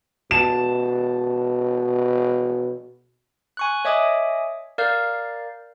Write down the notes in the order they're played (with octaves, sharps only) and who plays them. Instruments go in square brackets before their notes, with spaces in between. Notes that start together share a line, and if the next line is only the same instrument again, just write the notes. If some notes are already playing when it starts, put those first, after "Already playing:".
[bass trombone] B2 [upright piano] A5 E7
[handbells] G#5 C#6 F#6
C#5 D#5 E5 G#5 D6 D#6
A#4 D5 F5 F6 G6